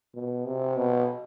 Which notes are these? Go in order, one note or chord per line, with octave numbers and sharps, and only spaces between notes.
B2
C3
B2